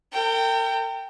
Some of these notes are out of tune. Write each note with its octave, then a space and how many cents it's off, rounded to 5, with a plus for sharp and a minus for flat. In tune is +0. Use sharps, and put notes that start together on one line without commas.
A#4 -45 G5 +0